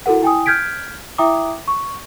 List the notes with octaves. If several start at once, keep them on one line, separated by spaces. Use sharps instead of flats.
E4 F#4 A4 A#4 F#5
E4 G5 G#5 D#6
F6 G6 G#6 B6 D7
E4 E5 G5 A#5 D6 D#6
C#6